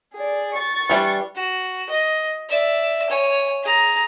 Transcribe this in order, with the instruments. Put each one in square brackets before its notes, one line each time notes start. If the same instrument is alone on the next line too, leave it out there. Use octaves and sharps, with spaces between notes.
[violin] G#4 D5
C#6 A6
[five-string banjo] E3 G3 D4
[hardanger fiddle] F#4
D#5
D5 E5
C#5 G#5
G#4 A#5